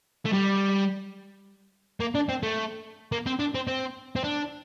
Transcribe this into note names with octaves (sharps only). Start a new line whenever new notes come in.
A3
G3
A#3
D4
C4
A3
A#3
C4
D4
C4
C4
C4
D4